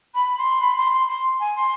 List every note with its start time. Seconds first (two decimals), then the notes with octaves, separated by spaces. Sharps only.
0.14 B5
0.38 C6
0.61 B5
0.77 C6
0.92 C6
1.08 C6
1.40 G#5
1.56 C6